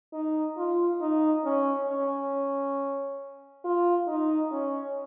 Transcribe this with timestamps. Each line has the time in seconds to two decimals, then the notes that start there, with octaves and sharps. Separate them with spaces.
0.13 D#4
0.57 F4
1.01 D#4
1.45 C#4
1.89 C#4
3.65 F4
4.08 D#4
4.52 C#4